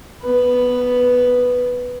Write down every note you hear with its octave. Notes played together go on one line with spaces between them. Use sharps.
B3 B4